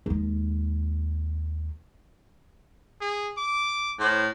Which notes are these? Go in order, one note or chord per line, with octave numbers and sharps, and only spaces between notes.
D#2 G#3
G#4
D6
A2 C5